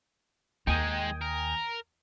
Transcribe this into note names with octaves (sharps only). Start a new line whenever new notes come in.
D#2 G#3 D#4 G5 G#5 D#6
A#4